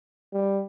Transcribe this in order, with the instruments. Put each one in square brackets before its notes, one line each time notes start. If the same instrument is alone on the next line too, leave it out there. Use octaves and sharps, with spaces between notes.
[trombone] G3